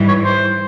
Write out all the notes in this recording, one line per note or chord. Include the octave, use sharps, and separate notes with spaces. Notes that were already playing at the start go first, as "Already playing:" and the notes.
Already playing: G#2 E3 G3
C#5
C5